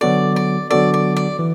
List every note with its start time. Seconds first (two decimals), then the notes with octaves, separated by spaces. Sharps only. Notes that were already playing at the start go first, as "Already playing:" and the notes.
0.01 D3 F#3 B3 F#4 A4 D5
0.36 D5
0.70 D3 F#3 B3 F#4 A4 D5
0.94 D5
1.16 D5
1.39 E3